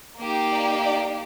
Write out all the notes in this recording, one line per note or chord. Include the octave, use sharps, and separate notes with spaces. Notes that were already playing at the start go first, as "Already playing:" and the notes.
A#3 D#4 G4
D5
D5